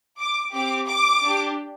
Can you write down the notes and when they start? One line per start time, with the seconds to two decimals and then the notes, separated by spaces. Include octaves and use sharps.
0.19 D6
0.53 C4 G4 D6
0.88 D6
1.23 D4 G4